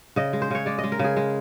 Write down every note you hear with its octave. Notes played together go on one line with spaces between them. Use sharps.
C#3 D#5
G#3
C5
C#3 C#5
G#3 D5
D#5
G#3
A#4
C#3 G#4
G#3